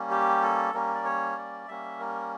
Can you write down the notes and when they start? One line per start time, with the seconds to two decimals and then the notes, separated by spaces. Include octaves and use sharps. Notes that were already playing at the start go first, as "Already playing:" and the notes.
Already playing: G3 A#3 C#4
0.10 G4
0.43 A4
0.74 G3 A#3 C#4 A#4
0.95 D5
1.05 C#5
1.37 D5
1.68 G3 A#3 C#4 E5
2.00 A#4